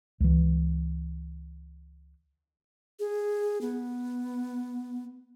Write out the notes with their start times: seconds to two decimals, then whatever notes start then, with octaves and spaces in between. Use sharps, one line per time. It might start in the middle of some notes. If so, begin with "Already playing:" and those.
0.20 C#2 E3
3.00 G#4
3.61 B3